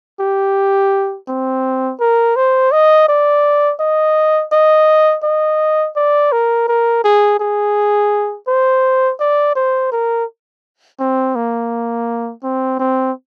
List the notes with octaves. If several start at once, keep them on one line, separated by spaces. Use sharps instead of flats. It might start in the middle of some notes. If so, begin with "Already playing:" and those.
G4
C4
A#4
C5
D#5
D5
D#5
D#5
D#5
D5
A#4
A#4
G#4
G#4
C5
D5
C5
A#4
C4
A#3
C4
C4